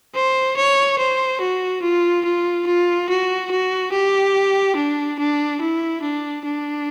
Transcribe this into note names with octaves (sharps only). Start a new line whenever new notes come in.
C5
C#5
C5
F#4
F4
F4
F4
F#4
F#4
G4
D4
D4
E4
D4
D4